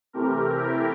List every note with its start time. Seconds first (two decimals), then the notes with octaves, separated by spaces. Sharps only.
0.13 C3 E3 A3 C4 G4 A#4
0.58 E4 G4